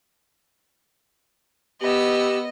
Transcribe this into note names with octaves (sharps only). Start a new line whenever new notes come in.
B3 G4 D#5 E6